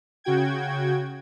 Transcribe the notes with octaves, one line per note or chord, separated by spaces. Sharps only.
C#3 F#4 G5 G#6